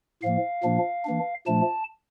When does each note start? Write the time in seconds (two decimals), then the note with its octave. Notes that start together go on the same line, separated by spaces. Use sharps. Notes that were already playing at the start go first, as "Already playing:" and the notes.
0.22 A2 F3 A#3 F5
0.63 A#2 F3 A#3 D4
1.05 E3 A#3 D4
1.46 A#2 F3 A3 D4 A5